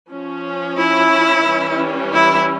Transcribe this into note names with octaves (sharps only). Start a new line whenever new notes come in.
F3 C#4
E4
E3 G3 C#4
E4